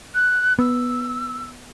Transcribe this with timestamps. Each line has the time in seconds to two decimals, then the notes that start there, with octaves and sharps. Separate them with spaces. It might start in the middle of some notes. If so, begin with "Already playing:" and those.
0.14 F#6
0.59 B3 E6